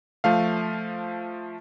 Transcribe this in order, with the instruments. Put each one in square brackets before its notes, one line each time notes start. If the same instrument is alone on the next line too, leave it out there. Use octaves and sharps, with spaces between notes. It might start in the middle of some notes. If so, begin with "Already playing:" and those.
[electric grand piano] F3 A3 F5